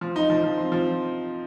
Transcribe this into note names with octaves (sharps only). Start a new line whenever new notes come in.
F3
D#4
F3
F3
C4
F3